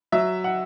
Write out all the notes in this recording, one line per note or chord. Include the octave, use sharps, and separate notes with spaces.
F#3 E5
F#5